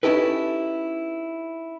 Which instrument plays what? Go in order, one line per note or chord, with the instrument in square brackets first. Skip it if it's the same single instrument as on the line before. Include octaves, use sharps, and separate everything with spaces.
[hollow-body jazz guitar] C#4 D#4 E4 G4 A4 B4